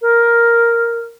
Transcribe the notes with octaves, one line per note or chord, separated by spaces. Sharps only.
A#4